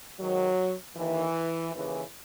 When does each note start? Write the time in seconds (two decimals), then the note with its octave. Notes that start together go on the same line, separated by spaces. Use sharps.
0.19 G#2 D#3 F#3
0.97 D#2 D#3 E3
1.74 D#2 C#3 E3